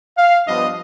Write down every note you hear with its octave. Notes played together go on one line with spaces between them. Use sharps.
F5
G2 F3 B3 D4 D#5